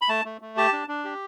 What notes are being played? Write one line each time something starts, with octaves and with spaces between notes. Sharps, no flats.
B5
A3 A5
A3
A3
G4 A5
D4
D4
G4